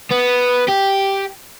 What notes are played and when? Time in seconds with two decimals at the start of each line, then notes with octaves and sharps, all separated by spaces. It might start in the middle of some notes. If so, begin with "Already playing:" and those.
0.11 B3
0.68 G4